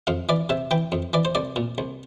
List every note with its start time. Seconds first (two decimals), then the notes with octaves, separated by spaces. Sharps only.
0.07 F2 F5
0.29 E3 D5
0.49 C3 E5
0.71 E3 G5
0.92 F2
1.13 E3 D5
1.25 C5
1.35 C2 D5
1.56 A#2
1.78 C2